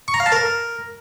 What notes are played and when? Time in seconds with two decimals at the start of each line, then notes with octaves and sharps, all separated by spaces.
0.08 C#6
0.14 A#5
0.20 F5
0.26 A5
0.32 A#4